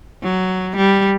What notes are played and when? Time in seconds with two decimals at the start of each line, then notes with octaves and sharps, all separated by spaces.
0.23 F#3
0.77 G3